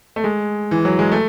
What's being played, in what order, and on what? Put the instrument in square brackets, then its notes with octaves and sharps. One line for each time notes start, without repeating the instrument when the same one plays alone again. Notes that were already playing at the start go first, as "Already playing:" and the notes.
[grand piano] A3
G#3
E3
F#3
G#3
A3